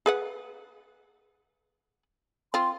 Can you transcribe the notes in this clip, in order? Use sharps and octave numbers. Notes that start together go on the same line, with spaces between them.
G#4 B4 F#5
C4 F4 C6